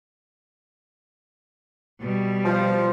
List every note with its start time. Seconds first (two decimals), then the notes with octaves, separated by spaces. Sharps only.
2.01 B2 G3
2.44 F3